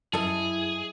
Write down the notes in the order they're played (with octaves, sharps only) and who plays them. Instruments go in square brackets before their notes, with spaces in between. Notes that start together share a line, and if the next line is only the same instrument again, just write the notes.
[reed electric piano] F#2 [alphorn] E4 [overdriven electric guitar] G#4 [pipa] A4 D#5